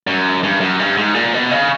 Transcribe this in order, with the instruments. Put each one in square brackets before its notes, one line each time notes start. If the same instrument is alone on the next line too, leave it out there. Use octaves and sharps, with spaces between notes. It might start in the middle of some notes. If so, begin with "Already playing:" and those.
[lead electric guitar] F#2
G2
F#2
G2
G#2
A#2
B2
C#3